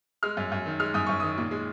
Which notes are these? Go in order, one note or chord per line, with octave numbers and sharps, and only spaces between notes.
G#3 F6
F#2
F#2
D#3
G#3 F6
F#2 D#6
F#2 C#6
D#3 D#6
A#2
G#3